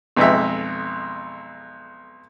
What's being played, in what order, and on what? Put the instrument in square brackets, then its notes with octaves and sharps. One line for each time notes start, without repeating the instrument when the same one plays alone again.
[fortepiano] B1 F2 G#3 E5